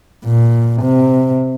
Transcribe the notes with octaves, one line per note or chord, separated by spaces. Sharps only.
A#2
C3